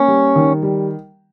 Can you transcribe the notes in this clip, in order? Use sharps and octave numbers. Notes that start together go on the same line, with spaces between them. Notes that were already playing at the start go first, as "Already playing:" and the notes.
Already playing: A#3 C#4
G3
D#3
G3